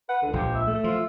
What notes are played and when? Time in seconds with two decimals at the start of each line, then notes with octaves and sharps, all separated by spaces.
0.09 B4 F#5
0.22 C#2 D3
0.33 A#1 A#2 F3 G4
0.55 E5
0.67 A3
0.84 F3 F4